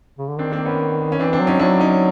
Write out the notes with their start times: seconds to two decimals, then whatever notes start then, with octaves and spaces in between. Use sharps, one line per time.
0.18 C#3
0.29 D3
0.38 D#3 C4 D4
0.52 A#3 C4
0.65 B3 C#4
1.12 C#4
1.19 E3 C4 D4
1.33 C4 D4
1.41 F#3
1.47 C#4 D#4
1.60 F#3 D4 E4
1.80 C#4 D#4